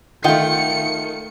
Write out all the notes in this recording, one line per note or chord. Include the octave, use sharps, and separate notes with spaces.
D#3 A3 F4 D#5 F#5 G5 C#7